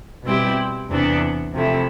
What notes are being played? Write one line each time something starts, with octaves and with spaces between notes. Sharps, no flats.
B2 G3 C4 E4 G4
E2 C3 E3 B3 D4
C3 F3 A3 E4